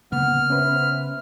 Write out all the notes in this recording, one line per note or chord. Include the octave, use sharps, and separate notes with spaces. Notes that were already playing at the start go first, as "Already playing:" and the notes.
C#3 A#3 B3 F#5 F6
C#4 B4 C5 E5